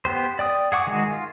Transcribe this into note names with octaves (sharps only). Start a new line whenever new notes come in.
B3 G4 C5
D5 G5 D#6
G#4 F#5 C#6 D6
D#3 G#3 F#4 G#4
F4